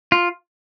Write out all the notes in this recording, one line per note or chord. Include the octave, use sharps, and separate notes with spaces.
F4